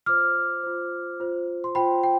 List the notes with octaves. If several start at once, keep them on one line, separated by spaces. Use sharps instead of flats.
F4 C5 D6 F6
F4 C5
F4 C5
C6
F4 C5 G5 B5
G5